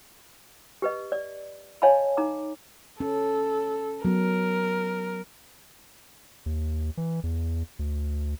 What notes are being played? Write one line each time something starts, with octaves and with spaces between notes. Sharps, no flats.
G4 B4 D#5
D5
C#5 D#5 F5 G#5 A5 B5
D#4 A#5 D6
C#4 A4
F#3 B3 A#4
D#2
E3
E2
D2